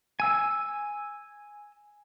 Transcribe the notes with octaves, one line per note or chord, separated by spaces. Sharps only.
G#5 E6